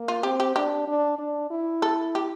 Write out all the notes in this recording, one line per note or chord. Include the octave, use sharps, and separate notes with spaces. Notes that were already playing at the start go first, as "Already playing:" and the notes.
Already playing: A#3
F4
C4 G4
G4
D4 G4
D4
D4
E4
A4
G4